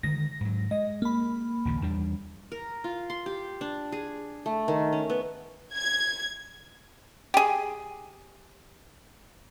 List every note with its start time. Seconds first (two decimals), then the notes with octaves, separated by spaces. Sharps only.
0.03 D3 D#3 G#3 A#6
0.41 G#2 F#3
0.71 G#3 D#5
1.02 A#3 B5
1.65 A#1 D#2 C#3
1.82 E2 G3 D4
2.52 A#4
2.84 F4
3.10 C6
3.26 G4
3.61 D4
3.92 G#4
4.46 A3
4.68 D#3
4.93 C#4
5.10 B3
5.74 G#6
7.34 G4 G#4